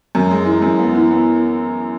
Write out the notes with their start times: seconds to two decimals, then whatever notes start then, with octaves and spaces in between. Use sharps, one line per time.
0.15 F#2
0.31 G#3
0.46 E3
0.62 F#2
0.79 B3
0.95 E3
1.11 B3